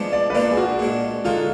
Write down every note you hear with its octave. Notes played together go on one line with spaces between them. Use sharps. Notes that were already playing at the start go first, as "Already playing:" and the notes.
Already playing: F3 G#3 B3 D4
D5
B4
B2 A#3 D4 F4 D5
G#4
F#4
A#2 G#3 D4
D3 G#3 D#4 F4 F#4